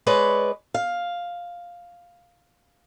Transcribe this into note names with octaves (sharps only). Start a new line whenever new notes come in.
G#3 B4 C#5 D5
F5